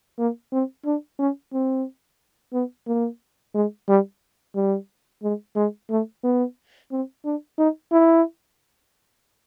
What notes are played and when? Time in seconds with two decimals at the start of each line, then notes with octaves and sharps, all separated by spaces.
0.19 A#3
0.52 C4
0.85 D4
1.19 C#4
1.53 C4
2.53 B3
2.87 A#3
3.55 G#3
3.89 G3
4.55 G3
5.23 G#3
5.56 G#3
5.90 A3
6.24 B3
6.92 C4
7.25 D4
7.58 D#4
7.92 E4